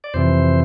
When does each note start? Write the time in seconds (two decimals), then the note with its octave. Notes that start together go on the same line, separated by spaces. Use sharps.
0.04 D5
0.14 F2 C3 E3 C5